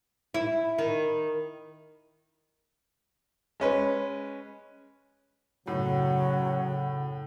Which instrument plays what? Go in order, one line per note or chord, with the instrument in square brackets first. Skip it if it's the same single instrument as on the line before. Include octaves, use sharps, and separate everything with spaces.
[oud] E4
D#3
[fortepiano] G#3 C#4 B4
[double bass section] F#2 C#3 [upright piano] A2 [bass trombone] F#3 [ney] F#5